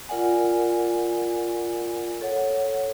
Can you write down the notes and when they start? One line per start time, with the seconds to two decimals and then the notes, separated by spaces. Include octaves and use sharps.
0.09 F4 A#4 D5 F#5 G#5
2.21 A4 C#5 F#5